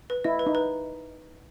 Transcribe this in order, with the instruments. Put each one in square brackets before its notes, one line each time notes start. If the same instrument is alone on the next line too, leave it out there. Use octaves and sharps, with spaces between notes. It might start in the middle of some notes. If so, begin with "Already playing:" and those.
[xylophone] B4
[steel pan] E4 [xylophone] D#5
[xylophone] B4
[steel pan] D#4
[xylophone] B4